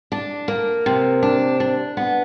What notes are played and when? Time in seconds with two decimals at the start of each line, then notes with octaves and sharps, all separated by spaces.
0.12 D4
0.48 A#3
0.86 C3
1.23 D4
1.60 D4
1.97 B3